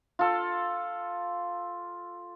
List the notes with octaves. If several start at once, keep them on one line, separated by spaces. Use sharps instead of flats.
F4 A4